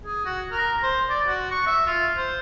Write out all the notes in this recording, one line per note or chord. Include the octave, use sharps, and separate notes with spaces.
G#4
F#4
A#4
C5
D5
F#4
C#6
E5
F4
C5